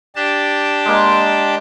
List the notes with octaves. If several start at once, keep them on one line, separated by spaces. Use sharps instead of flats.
D4 G4 A5
G#3 A#3